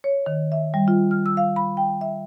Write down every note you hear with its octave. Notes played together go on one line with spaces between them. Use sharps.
C#5
D#3
E5
G3
F4
F6
E6
F5
B5
G5
E5